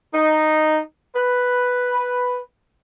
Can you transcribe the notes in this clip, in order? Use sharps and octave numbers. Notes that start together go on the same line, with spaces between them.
D#4
B4